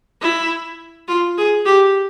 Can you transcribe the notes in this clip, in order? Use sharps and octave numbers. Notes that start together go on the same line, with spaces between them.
E4
F4
G#4
G4